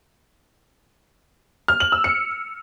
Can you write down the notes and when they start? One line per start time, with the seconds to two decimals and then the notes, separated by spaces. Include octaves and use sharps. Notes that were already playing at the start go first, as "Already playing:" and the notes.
1.68 F6
1.80 F#7
1.92 E6
2.04 C#7